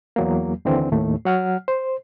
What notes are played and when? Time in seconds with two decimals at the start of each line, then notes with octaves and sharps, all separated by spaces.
0.16 E2 F#3 A#3
0.65 D#2 D3 E3 C4
0.92 D#2 A2 A3
1.25 F#3 F#5 F6
1.68 C5